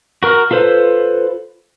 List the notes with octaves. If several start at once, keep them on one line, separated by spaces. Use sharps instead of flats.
F#4 A#4 F6
F4 A4 B4 C5